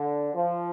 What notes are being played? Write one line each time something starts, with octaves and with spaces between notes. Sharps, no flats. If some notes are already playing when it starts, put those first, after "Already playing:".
Already playing: D3
F3